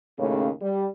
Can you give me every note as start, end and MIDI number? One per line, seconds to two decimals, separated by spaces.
0.17 0.48 39
0.17 0.48 45
0.17 0.48 49
0.60 0.86 55